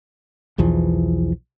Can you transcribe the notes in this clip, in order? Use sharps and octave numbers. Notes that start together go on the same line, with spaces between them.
B1 E2 E3 F3